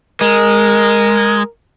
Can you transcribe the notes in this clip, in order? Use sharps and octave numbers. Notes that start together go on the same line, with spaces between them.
G#3 A#4